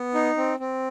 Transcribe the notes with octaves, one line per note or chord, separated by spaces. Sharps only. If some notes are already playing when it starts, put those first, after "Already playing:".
Already playing: B3
D#4
C4
C4